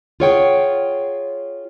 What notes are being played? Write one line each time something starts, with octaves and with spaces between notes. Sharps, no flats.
F4 G#4 C#5 F#5 G5